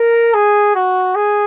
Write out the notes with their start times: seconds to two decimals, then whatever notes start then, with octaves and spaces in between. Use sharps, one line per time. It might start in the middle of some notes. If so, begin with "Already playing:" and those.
Already playing: A#4
0.34 G#4
0.75 F#4
1.16 G#4